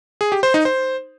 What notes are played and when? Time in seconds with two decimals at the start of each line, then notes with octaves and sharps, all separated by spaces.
0.21 G#4
0.32 G4
0.43 C5
0.54 D#4
0.65 C5